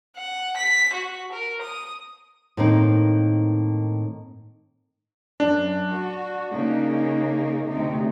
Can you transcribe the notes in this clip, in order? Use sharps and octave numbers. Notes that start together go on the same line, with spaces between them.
F#5
B6
F#4
A#4
D#6
A2 D#3 A#3 C4 D#4
F#2 D4
F#4
C#3 A#3 D#4
D2 C3 D#4